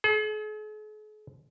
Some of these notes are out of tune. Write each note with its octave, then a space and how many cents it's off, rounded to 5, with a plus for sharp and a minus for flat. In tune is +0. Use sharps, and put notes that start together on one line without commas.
G#4 +45